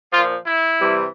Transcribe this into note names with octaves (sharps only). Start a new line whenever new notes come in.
A#2 F3 F4
E4
C3 E3 G3